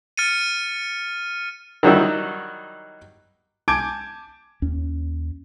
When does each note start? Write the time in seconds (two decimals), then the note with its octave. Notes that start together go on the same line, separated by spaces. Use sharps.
0.17 F6 A6 C#7 D#7
1.83 D#3 F#3 G3 E4
3.68 G#5 A5 D6 G6 G#6 D7
4.62 D#2 C#4